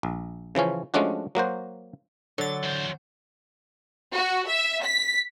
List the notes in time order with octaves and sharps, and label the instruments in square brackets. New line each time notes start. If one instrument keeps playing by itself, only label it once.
[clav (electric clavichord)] A#1
C#3 E3 F3 C#4
F3 G#3 A3 C#4 D4 F#4
F#3 A#3 F#4 C5
[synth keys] D3 A6 [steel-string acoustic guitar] F#3
[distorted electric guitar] E2 C5
[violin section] F#4
E5
B6